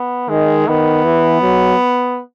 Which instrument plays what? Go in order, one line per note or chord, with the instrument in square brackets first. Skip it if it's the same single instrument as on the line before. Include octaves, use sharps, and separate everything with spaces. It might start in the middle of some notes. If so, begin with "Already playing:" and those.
Already playing: [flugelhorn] B3
[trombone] D#3 [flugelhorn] G#3
[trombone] D#3 [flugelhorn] B3
[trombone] E3
F#3